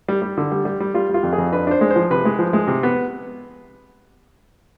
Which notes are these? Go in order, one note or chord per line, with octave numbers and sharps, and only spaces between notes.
G3
G3
D3
G3
G3
G3
G3 F4
G3 F4
F2
G#4
F2
D4 B4
D4 C5
G#3
C5
F3
C3 B4
G#3
F3
G#3
C3
B3